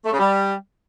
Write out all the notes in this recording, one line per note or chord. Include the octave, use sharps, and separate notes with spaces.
A3
C#3
G3